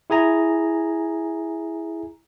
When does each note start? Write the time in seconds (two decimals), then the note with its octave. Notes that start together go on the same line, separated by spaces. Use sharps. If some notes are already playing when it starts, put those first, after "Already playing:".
0.10 E4 G#4 G#5 A#5